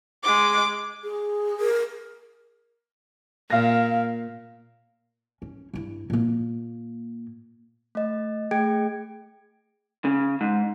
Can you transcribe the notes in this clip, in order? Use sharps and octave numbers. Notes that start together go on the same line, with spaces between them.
G#3 D6
G#4
A#4
A#2 F5 A#6
C#4
G2 E4
A#2 A#3
A3 D#5
A3 G#4 G5 G#6 D7
C#3
G#2